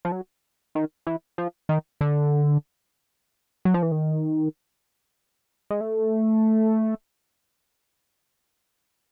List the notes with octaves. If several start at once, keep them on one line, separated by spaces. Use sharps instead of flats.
F3
F#3
D#3
E3
F3
D#3
D3
F#3
F3
E3
D#3
G#3
A3